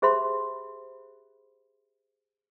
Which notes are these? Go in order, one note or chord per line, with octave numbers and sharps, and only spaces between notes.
G4 G#4 C5 E5 B5 C6